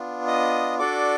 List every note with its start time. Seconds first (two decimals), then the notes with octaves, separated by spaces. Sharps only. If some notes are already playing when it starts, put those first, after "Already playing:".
Already playing: B3 D4 F4
0.27 D#5 D#6
0.79 D4 F#4 A4 D5 D6